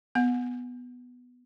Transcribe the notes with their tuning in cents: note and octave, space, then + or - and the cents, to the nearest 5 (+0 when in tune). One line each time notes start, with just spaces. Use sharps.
B3 +0 F#5 -30